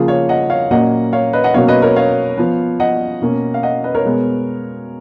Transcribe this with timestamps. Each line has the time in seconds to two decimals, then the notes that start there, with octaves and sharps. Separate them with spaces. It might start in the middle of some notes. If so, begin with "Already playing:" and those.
Already playing: C#3 F3 A#3 F4 G#4
0.08 C#5 F5
0.29 D#5 F#5
0.50 C#5 F5
0.71 A#2 F#3 A#3 C#4 D#5 F#5
1.13 C#5 F5
1.33 B4 D#5
1.44 D#5 F#5
1.54 B2 F#3 A#3 C#4 C#5 F5
1.68 B4 D#5
1.82 A#4 C#5
1.96 C#5 F5
2.38 F3 B3
2.80 D#5 F#5
3.22 B2 A#3 C#4
3.54 F5
3.63 D#5 F#5
3.84 B4 D#5
3.94 A#4 C#5
4.05 B2 G#3 B3